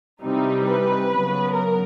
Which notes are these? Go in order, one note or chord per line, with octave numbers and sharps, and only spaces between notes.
C3 E3 G3 C4 D#4
B4
C#3 F#3 B3
A#4